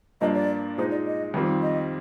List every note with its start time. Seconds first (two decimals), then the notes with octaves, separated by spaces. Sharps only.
0.21 G2 F3 A#3 D4 F4 D#5
0.35 D5
0.77 A#2 G#3 D#4 C5
0.91 D5
1.06 D#5
1.34 F2 D#3 G3 C4 F4
1.62 D#5